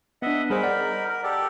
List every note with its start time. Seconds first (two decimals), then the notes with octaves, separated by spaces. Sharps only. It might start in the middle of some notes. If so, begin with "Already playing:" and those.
0.22 B3 D4 D#5 E5 F#5
0.50 G3 D#4 G#4 A#4 C5 B5
0.63 D5 F#5
1.09 A#4
1.24 G4 A4 D5